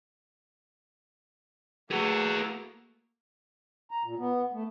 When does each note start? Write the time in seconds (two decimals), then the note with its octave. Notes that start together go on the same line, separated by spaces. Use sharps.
1.91 A3 A#3 F#4 G#4 B4
3.91 A#5
4.04 A#2
4.19 B3
4.53 A3